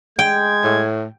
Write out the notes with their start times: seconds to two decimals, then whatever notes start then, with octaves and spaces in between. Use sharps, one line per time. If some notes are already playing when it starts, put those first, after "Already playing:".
0.19 G#3 G5 G#6
0.64 A2